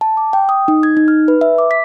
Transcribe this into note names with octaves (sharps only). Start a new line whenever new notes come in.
A5
D6
G5
D#6
D#4
G#6
D#4
F6
B4
E5
D6
B6